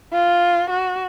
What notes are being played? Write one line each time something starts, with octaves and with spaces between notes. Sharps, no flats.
F4
F#4